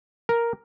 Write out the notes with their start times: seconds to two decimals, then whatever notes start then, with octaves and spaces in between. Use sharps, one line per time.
0.29 A#4